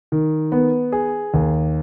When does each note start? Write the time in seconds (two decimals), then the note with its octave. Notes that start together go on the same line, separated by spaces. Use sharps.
0.12 D#3
0.52 B3
0.92 G#4
1.34 D#2